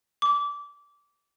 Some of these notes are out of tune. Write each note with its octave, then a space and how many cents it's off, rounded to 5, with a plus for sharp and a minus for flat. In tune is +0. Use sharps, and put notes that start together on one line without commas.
D6 -20